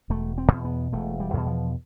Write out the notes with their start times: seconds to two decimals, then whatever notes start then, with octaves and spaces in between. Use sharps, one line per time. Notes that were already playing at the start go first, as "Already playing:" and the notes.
0.10 E1 A3
0.38 C4
0.51 E2 B2
0.65 B3
0.92 E1 A3
1.20 G3
1.34 E2 B2
1.47 F3